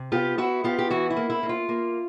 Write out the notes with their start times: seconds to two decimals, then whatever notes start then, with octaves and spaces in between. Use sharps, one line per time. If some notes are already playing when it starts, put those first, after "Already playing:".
Already playing: C3
0.12 B3 F4 G4
0.38 B3 E4 F#4
0.64 B3 F4 G4
0.79 G4
0.90 E3 E4 F#4
1.10 E4
1.17 A#3
1.30 E4
1.43 A#3
1.49 F4
1.69 A#3